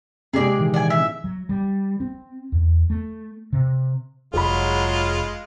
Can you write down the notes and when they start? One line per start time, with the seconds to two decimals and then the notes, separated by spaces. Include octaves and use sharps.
0.33 C3 G#3 G#4 D5
0.57 A#2 D#3 E3
0.74 D5 G#5
0.90 E5
1.24 F#3
1.49 G3
2.00 C4
2.52 E2
2.90 A3
3.53 C3
4.34 F1 F#3 G#3 F4 G#4 B5